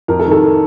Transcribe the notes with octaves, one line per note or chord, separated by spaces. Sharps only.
F2 A#4
A4
D#3
A4